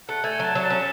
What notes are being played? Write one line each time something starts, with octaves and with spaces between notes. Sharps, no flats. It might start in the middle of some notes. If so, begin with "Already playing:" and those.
A3 F#5
A3 G#5
F#3 A5
F#3
A5
C#4